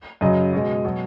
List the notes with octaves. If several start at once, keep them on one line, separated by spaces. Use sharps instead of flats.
F#2 C#3 F#3 D#5
B2 G#3
B2 F#3